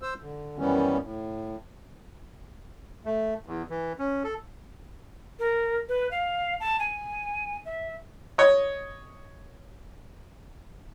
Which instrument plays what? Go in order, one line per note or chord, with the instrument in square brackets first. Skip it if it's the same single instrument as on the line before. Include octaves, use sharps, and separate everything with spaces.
[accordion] C5 E6
D3
F#2 D#3 E3 G3 B3 C#4
A2
[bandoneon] A3
E2
E3
C#4
A4
[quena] A#4
B4
F5
A5
G#5
E5
[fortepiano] C#5 D#5